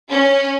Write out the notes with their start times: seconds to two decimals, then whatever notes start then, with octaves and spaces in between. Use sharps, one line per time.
0.10 C#4